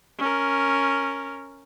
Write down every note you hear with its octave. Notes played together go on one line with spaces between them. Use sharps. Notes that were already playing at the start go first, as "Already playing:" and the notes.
C#4 A#4